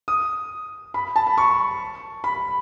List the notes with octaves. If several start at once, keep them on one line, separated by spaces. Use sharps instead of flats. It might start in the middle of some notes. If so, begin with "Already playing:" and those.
D#6
B5
A5
B5
C#6
B5